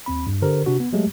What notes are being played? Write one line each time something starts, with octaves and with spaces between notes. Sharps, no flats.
D#2 C4 B5
G2
D3 G4 A#4 C5
C3 D4 F#4
B3
F#3 G#3 A3 G4